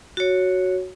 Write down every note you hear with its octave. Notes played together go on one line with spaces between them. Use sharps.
F#4 C#5